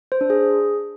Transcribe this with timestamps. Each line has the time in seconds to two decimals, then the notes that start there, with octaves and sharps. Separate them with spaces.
0.12 C5
0.21 D4
0.30 G#4